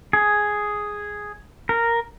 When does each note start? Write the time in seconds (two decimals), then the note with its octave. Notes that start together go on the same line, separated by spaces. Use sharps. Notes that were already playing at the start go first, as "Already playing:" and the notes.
0.13 G#4
1.69 A#4